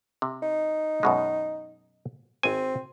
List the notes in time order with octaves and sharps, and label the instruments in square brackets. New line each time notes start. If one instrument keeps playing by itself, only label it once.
[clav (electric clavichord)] C3
[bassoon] D#4
[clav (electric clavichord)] F#2 B2 G#3
[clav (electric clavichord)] G#1 G#5 [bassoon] C4